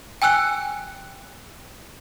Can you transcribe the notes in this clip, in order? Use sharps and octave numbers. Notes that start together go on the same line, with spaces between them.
G5 G#5 E6 F#6 C#7